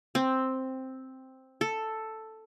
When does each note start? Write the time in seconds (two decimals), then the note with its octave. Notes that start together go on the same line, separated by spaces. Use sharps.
0.15 C4
1.61 A4